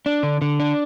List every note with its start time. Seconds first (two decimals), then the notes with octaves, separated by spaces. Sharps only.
0.06 D4
0.23 D3
0.42 D3
0.60 D4